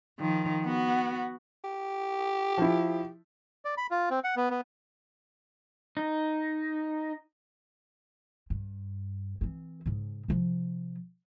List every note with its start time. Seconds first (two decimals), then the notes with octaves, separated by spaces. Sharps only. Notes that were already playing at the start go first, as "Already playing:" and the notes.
0.20 D#3 F3
0.66 B3 F#4
1.65 G4
2.58 F3 E4
3.65 D5
3.77 B5
3.91 F4
4.10 C4
4.24 F#5
4.36 B3
4.50 B3
5.97 D#4
8.50 G2
9.41 E3 C4
9.86 G#2 C#3
10.28 C3 F3